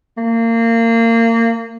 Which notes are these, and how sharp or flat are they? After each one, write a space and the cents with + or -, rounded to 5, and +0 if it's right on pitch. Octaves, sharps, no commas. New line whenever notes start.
A#3 -25